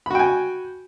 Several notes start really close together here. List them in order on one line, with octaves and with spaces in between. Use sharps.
B5 F#4 G5 G#5